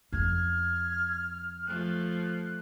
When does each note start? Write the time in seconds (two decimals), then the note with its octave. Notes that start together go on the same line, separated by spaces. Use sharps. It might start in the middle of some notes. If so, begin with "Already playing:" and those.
0.12 F2 C#3 F6 G#6
1.66 F3 A3 F#6